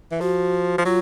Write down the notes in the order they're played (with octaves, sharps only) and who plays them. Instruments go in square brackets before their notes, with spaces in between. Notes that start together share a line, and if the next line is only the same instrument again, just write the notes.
[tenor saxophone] E3
[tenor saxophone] F3 [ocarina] F#4
[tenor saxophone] F3
[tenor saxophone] F#3 [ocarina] F4